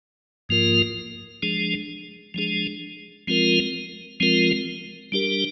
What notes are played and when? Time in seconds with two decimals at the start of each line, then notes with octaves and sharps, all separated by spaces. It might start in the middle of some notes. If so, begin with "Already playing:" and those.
0.49 G#2 F3 A#3 F4 A#4
1.42 F3 G#3 D4 G#4
2.34 F3 G#3 D4 G#4
3.27 F3 G#3 C4 F4 A#4
4.20 F3 G#3 C4 F4 A#4
5.12 G3 D4 G4 A#4